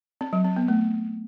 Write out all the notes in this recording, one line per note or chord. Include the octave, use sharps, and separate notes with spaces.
C4
F#3
C4
B3
A3